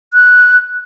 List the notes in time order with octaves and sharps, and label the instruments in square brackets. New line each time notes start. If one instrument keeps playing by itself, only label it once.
[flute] F#6